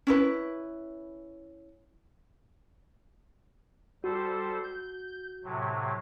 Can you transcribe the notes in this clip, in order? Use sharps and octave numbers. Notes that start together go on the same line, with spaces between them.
C#4 E4 B4
G3 F#4 A4 C5
G6
A2 C3 F#3